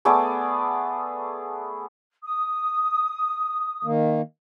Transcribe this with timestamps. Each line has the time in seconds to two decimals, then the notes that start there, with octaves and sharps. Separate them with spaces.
0.05 A3 B3 G#4 D5
2.23 D#6
3.84 D#3 A#3